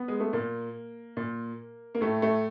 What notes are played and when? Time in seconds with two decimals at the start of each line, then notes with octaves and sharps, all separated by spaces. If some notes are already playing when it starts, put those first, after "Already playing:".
Already playing: B3
0.08 G#3
0.20 A3
0.33 A#2 A#3
1.17 A#2
1.95 A#3
2.01 A2 A3
2.22 A3